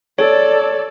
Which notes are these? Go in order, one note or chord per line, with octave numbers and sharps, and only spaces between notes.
A4 C#5 D5